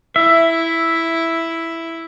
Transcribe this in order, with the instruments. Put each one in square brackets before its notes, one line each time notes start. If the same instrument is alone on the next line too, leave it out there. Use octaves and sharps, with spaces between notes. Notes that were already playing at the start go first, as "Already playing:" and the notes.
[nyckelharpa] E4 [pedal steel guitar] E5